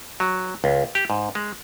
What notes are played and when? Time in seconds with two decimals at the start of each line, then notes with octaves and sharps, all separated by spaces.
0.20 F#3
0.64 C#2
0.95 G4
1.10 G#2
1.35 G#3